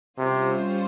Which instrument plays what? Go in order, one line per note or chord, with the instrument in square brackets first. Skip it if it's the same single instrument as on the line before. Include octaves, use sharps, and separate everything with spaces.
[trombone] C3 [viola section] G3 C#4 F4 C5